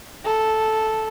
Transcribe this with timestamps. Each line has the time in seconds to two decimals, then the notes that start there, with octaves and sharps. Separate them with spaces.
0.24 A4